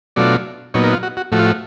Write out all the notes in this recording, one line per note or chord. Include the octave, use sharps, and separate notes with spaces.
B2 F#3 A3 D4 F4 D5
A#2 F#3 B3 D#4 C#5
A#4
F4
F#4
F#4
A2 F3 A3 F#4
F4
F#4